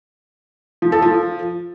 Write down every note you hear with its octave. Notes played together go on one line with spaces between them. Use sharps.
F3
A4
F3